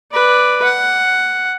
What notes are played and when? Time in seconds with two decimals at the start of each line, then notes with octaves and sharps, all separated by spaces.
0.12 B4 D5
0.64 F#5